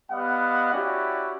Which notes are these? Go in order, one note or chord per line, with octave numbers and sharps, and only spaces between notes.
G3 B3 D#5 F5 F#5
C#4 E4 F#4 G4 D5